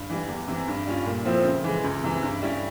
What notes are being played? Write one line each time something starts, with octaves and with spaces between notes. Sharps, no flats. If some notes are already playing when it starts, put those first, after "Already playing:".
Already playing: G2
E3 G3
E2
C3 E3
G2
G3 C#4 F4
A#2
F3 C4 E4
C#3
E3 G#3
C#2
C3 E3
G2
G3 C#4 E4